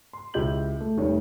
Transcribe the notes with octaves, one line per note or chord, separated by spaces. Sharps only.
C6
C#2 E4 G4 D#5 G6 F#7
A3
F1 D#3 G3 A3 C#5